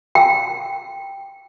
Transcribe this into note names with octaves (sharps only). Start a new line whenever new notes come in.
G5